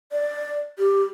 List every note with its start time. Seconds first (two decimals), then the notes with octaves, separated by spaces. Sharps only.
0.12 D5
0.79 G4